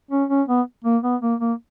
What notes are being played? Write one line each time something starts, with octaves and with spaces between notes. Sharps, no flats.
C#4
C#4
B3
A#3
B3
A#3
A#3